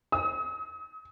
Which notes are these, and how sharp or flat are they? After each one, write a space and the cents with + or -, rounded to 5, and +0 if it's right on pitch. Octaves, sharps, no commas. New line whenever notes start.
D#6 +40